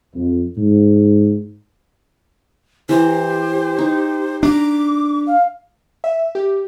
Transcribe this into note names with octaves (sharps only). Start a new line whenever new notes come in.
F2
G#2
E3 G4 C5 A#5
D#4
D4 A#5 D6
F5
E5
G4